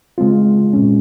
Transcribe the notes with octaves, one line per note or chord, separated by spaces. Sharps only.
C#3 G#3 C4 F4
A#2 G#3 C#4